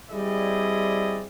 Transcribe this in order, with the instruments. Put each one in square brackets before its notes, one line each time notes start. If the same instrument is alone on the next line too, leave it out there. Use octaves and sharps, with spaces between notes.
[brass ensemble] G3 C4 E4 G#4 D5 D#5